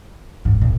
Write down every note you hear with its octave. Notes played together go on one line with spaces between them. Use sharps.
G#2
A#2